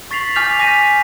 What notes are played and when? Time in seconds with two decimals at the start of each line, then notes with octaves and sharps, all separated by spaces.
0.11 C#6 A6 B6 C7 F7 F#7
0.35 G#5 D6 F6 G6 B6 F7
0.59 G#5 D6 G6 A#6 B6 D#7